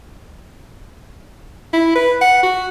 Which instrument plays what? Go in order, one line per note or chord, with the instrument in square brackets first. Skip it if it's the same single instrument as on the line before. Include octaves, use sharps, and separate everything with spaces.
[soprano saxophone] E4
B4
F#5
F#4